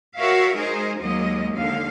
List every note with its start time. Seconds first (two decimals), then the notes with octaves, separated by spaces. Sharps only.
0.17 F#4 A#4 C#5 E5 F5
0.55 G#3 D#4 G#4 A#4 C5
0.99 D#2 F#3 G#3 A#3 D#5
1.54 D#2 D3 F5